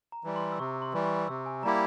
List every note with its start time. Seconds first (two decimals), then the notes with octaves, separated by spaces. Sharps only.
0.12 A#5
0.24 E3 G3
0.36 C6
0.52 E6
0.59 C3 C#6
0.82 C6
0.93 E3 G3
1.05 C#6
1.28 C3 E6
1.46 G#5
1.63 G3 A#3 E4 G4 A#5